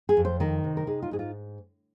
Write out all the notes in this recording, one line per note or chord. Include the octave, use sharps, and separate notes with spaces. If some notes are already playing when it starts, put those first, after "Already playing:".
G#4
F2
C5
D#3 A#4
C3
A#4
D#4 G#4
F4
G#2 G#4
F4